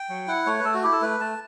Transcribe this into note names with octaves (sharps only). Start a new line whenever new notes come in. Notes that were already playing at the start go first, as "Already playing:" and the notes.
Already playing: G5
F#3
E4 F#5
A3 C#5
B4
A3 A4
F#4
E4 G4
A4
A3 B4
A3 A5